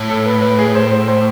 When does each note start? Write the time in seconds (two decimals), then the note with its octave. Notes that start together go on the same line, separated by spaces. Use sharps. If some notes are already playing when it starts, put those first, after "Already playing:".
Already playing: A2
0.10 A4
0.26 B4
0.42 B4
0.59 G#4
0.75 C5
0.91 C5
1.08 C5